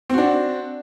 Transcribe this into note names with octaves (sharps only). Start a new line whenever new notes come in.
C4 D4 F#4